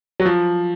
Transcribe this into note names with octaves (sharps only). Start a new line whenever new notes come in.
F#3
F3